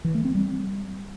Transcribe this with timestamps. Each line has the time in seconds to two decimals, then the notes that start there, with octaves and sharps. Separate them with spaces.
0.04 E3
0.15 A3
0.25 C4
0.35 G3